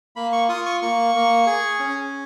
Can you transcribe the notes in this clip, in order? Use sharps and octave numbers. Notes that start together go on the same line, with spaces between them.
A#3 B5
C#6
F4 D#6
C#6
A#3 C#6
A#3
G#4
C#4